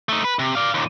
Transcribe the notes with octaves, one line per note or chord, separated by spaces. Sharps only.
A3 D#4
B4
C3
D5 F5
D#2 A#2